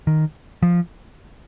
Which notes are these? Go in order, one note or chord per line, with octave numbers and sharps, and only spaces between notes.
D#3
F3